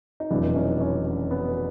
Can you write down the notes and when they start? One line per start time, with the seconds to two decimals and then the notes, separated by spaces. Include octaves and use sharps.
0.20 D#4
0.31 F1 E2 B2 F#3 D4 E4
0.55 C#4 D#4
0.80 C#4 D#4
1.31 B3